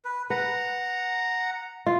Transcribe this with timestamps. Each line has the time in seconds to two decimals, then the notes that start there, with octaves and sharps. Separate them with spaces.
0.05 B4
0.30 B4 F#5 A#5
1.86 F4